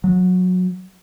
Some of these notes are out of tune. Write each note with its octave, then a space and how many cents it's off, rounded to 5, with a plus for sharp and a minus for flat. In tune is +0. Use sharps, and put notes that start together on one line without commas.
F#3 -20